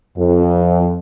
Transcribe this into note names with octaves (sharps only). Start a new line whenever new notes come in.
F2